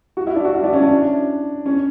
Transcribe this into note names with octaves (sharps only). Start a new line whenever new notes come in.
F#4
E4
D4
F#4
E4
D4
C#4
D4
C#4